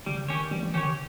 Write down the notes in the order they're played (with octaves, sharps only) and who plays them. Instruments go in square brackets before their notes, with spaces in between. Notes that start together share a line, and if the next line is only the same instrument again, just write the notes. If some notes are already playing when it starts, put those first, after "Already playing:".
[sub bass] C#3 [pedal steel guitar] G3
[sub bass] D#3 [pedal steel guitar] C#4 G4 C#5
[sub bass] E3 [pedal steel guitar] G3
[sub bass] E3
[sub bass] D#3 [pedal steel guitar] C#4 G4 C#5
[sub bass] C#3